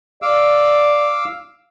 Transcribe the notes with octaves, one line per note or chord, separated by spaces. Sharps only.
D5 F5 D6 E6